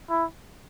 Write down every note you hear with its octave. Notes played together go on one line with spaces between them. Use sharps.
E4